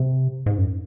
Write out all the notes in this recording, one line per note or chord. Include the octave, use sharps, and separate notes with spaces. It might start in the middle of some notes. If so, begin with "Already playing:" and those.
Already playing: C3
G#2
F#2